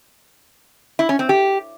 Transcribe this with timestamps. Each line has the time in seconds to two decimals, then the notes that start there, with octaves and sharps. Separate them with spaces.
0.99 E4
1.09 C#4
1.19 C4
1.29 G4